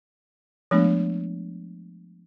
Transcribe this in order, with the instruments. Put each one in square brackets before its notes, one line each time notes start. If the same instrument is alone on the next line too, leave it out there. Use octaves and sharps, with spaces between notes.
[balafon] F3 G#3 A3 B3 D4